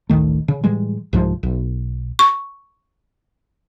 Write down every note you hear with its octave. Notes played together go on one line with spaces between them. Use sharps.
A1 D2 D#3 A3
C#3
A2 E3 G3 G#3
C2 G#2 F3 G#3
B1
C#6